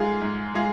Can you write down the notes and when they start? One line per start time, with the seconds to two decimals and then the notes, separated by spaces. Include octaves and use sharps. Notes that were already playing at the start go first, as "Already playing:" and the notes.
Already playing: G#2 G#3 F4 G#4 F5
0.21 G#2
0.54 G#3 F4 G#4 F5